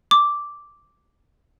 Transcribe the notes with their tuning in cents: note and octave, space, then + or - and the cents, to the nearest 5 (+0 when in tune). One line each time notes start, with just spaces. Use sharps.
D6 -5